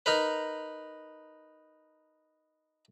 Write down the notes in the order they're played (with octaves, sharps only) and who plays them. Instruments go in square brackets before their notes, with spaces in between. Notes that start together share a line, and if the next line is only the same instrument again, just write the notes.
[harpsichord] D#4 A#4 B4